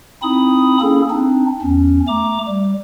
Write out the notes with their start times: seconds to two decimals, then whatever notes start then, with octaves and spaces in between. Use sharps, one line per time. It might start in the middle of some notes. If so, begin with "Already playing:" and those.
0.22 C4 D#4 E4 B5 D#6
0.80 A#3 C#4 E4 G#4 A4
1.10 C4 D4 D#4
1.61 E2 C#4
2.08 A3 A#5 D6
2.48 G3